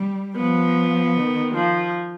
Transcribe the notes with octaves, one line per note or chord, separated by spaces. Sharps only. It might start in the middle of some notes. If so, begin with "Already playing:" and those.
Already playing: G3
F3 B3
D#3
F3